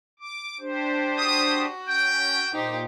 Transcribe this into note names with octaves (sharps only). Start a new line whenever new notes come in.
D6
D4 G4 C5
F#4 D#6
C#4 G5
A#2 D#4 G4 C5